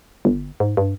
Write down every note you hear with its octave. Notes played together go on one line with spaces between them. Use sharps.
G1
G#2
G2